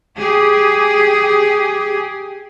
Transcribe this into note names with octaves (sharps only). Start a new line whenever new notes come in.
G4 G#4